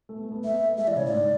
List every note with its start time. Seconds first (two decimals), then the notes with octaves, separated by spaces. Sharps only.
0.09 A3
0.16 B3
0.24 A3
0.31 B3
0.38 A3
0.44 B3 E5
0.53 A3
0.61 B3
0.68 A3
0.78 G#3 E5
0.87 E3 D5
0.96 C#3 C#5
1.04 A2 D5
1.12 G#2